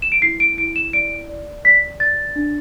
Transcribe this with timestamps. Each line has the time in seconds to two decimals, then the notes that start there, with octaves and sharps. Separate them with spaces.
0.02 E7
0.12 D7
0.22 E4 C7
0.40 D7
0.58 E4 D7
0.76 E7
0.93 D5 D7
1.29 D5
1.64 D5 B6
2.00 D5 A6
2.36 D4